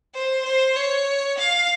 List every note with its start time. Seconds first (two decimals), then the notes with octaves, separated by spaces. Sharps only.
0.14 C5
0.45 C5
0.76 C#5
1.38 F5